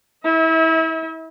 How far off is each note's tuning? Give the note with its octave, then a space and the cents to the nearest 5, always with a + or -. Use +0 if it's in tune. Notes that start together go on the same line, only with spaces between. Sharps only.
E4 -30 E5 -45